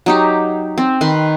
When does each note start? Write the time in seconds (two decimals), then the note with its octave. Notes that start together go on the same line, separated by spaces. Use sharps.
0.06 F#3 D#4 G4
0.78 C4
1.01 D#3 B4 C6